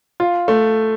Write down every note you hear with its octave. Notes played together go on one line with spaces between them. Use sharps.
F4
A3